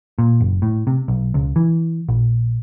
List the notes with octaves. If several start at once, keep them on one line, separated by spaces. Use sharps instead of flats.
A#2
F#1
A2
C3
B1
C#2
E3
A#1